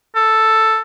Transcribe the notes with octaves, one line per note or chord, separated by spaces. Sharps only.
A4